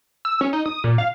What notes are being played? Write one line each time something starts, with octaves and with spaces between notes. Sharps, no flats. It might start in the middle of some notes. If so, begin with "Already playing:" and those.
E6
C#4
D#4
D#6
A#2
F5